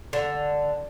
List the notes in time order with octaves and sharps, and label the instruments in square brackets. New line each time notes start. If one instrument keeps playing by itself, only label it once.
[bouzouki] D3